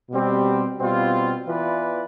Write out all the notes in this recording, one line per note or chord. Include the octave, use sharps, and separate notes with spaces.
B2 G3 C4 G4
B2 G3 C4 F4
E3 B3 F4 B4 D5